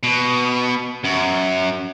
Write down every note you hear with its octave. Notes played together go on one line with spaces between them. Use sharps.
B2
F#2